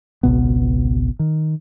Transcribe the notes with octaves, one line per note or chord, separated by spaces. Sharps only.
G#1 C#2 B2 B3
D#3